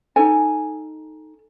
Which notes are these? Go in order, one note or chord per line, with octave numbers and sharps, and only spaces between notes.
D#4 A4 G#5